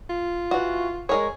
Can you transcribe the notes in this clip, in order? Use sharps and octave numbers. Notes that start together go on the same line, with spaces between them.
F4
E3 F#4
G#3 G#4 A#4 C#5